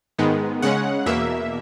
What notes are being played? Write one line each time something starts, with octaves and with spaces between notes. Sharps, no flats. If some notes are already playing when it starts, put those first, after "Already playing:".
G#2 D#3 G#3 B3
C#3 G#3 C#4 F#5
E2 B2 A#3 E5